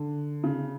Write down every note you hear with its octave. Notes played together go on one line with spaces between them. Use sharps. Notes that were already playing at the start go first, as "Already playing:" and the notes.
Already playing: D3
C#3